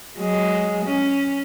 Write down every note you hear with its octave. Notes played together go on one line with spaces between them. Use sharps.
F#3 G#3
C#4